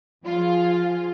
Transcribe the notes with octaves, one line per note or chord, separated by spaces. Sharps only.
F3 F4 G#4